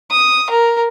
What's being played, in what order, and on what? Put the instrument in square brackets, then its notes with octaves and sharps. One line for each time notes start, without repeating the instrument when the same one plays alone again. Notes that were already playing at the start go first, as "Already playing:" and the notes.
[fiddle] D#6
A#4